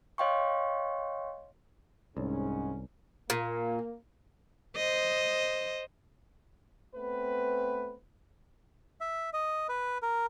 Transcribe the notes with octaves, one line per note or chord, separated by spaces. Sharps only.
C#5 D#5 F5 G5 C6 C#6
C2 G#2 C#4
A#2 A#3
C5 D#5
A3 B3 C4 B4
E5
D#5
B4
A#4